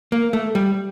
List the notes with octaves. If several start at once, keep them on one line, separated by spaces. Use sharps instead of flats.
A#3
A3
G3